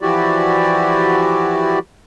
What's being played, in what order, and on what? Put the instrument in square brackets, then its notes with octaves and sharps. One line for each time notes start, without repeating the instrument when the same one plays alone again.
[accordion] E3 F3 E4 F#4 G4 D5